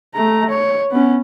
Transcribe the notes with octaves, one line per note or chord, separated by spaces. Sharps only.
A3 A#5
C#5
B3 C#4